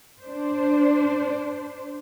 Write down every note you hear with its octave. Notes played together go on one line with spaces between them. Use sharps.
D4 C5